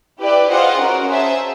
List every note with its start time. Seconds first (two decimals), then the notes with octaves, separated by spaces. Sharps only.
0.20 E4 G4 B4 D5
0.50 F4 G#4 C5 D#5 F#5
0.80 C#4 F#4 A#4
1.10 G#4 C5 E5 A5